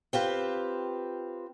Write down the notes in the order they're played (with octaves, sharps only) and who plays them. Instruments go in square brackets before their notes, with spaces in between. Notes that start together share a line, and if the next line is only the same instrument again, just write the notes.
[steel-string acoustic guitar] C4 F4 G4 B4